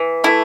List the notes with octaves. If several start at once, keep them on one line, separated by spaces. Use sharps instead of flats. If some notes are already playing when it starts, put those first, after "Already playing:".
Already playing: E3
A3 E4